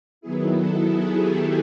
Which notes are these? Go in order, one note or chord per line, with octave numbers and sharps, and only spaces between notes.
D#3 F#3 B3 E4 G#4
A4
G#4
G4